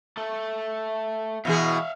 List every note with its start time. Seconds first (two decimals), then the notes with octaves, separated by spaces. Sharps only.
0.17 A3 A4
1.45 B2 E3 G#4 E5 F5